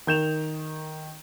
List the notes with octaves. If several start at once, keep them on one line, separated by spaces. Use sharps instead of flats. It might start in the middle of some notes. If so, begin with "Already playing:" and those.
D#3 G6 E7 F7